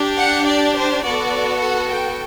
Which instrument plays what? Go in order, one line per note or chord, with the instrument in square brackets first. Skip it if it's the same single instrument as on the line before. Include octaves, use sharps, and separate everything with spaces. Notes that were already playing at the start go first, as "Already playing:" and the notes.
Already playing: [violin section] D4 G4
F#5
D5
C5
B3 F#4 A4 D5
F#5
G5